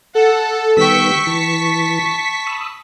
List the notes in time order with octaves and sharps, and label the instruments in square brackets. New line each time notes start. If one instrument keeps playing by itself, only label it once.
[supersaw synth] A4 [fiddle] F#5
[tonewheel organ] D#3 G3 B3 [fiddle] G5 E6 [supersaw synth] C#6 B6
[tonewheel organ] E3 [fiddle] A5
[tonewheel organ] B5 D#6 E6